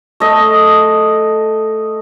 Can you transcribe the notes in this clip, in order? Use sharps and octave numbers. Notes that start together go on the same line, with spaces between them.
A3 D#5